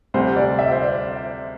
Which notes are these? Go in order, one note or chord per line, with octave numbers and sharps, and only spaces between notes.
D2 C3 G3 C5
D5
E5
C5
D5